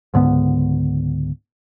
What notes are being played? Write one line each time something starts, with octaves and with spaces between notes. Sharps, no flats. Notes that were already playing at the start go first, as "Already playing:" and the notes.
C#2 G#2 D3 B3